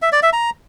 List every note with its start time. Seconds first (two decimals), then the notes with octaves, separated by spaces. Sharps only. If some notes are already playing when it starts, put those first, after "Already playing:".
0.02 E5
0.12 D5
0.23 E5
0.33 A#5